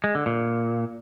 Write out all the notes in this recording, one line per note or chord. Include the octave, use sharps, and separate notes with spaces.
G#3
D3
A#2